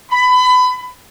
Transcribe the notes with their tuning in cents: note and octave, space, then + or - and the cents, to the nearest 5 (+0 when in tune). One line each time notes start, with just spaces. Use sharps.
B5 +25